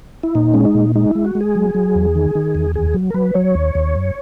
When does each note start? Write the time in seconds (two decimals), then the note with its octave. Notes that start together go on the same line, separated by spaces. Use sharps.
0.23 E4
0.35 A#2 D#4
0.54 G#3 C#4
0.65 D#4
0.75 A#2
0.95 G#3 D#4
1.10 E4
1.15 G#3
1.25 F#4
1.35 G#3
1.41 G#4
1.55 F#3
1.75 F#3
1.95 E2
2.15 D#3
2.35 D#3
2.55 E2
2.74 D#2 G#4
2.94 F#3
3.10 A#4
3.14 F#3 B4
3.34 F#3 C#5
3.55 D#2
3.75 D#2
3.95 F#2